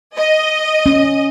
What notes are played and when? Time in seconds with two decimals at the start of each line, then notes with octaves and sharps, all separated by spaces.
0.16 D#5
0.86 C#4